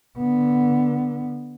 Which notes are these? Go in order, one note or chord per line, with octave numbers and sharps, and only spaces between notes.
D3 B3